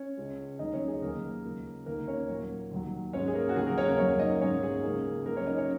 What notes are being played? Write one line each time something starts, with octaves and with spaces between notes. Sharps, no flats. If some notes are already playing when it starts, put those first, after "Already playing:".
Already playing: C#4 C#5
C#2 C#3 G#3
D#2 D#3 F#3 D#4 D#5
C#4 C#5
G#4
D#2 D#3 F#3 A#3 A#4
C#2 C#3 A#3
D#2 D#3 A#3 A#4
C#4 C#5
A#2 F#3 A#3
D#2 D#3 F#3
G#2 G#3 C#4 C#5
G#4
A#3 A#4
F#4
D#2 C#3 F#3 G#4
A#3 A#4
C#4 C#5
A#3 A#4
F#2 F#3 A#3 C#4 C#5
D#4 D#5
G#2 D#3 F#3 A#3 C#4 C#5
G#4
C#2 C#3 A#3
C#2 C#3 F#3 A#3 A#4
C#4 C#5
D#4 D#5
C#4 C#5